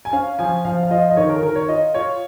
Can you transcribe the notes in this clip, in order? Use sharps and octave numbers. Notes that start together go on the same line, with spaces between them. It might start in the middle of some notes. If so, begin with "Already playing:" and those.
G#5
C#4 F5
F3 G#5
F3 F5
F5
F4 D#5
D#5
D#3 C#5
A#4
D#3 A#4
C#5
F4 D#5
F4 C#5